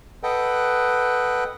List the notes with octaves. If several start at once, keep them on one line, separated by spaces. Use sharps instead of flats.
A4 B4 D#5 F#5 G5